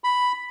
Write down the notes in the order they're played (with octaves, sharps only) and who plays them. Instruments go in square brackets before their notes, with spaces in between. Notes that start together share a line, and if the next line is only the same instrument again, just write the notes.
[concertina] B5